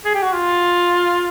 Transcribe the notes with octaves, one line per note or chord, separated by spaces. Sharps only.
G#4
G4
F#4
F4